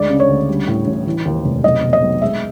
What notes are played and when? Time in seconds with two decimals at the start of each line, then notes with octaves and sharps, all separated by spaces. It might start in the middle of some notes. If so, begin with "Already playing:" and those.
Already playing: D2 G#3 D5
0.10 C#3
0.20 C#5
0.29 D2
0.49 G3
0.68 A2
0.87 A1
1.06 E3
1.25 D#2
1.44 F1
1.64 B1 D#5
1.82 B2
1.93 D#5
2.02 B1
2.21 G#3 E5